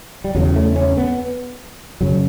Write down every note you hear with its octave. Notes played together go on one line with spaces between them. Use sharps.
G3
E2 C#3 F#3
A3
C#4
B3
F#2 C#3 F#3